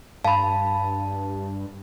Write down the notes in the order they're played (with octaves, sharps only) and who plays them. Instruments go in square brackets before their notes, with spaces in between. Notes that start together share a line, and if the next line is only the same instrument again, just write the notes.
[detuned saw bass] G2 [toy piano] F5 B5 [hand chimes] A5